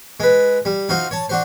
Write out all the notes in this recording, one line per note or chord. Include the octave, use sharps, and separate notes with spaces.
G#3 B4
G3
D#4 F4 F#4 C5
C#5 A5
D4 F#4 C5